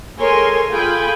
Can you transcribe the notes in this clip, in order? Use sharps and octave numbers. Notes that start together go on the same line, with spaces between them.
G#3 A4 A#4 C#5 G#5 C6
F4 G#4 A4 G5 G#5 B5